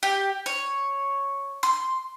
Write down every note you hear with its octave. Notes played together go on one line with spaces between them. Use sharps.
G4
C#5
C6